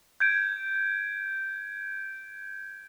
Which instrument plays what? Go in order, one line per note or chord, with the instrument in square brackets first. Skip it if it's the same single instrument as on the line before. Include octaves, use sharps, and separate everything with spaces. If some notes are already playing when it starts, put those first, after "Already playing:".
[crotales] G6 G#6 D7